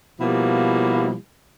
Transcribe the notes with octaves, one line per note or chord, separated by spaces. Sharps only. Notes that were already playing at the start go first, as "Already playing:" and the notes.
B2 F3 G3 A#3 E4